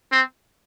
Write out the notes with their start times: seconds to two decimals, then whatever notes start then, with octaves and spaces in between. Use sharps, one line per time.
0.12 C4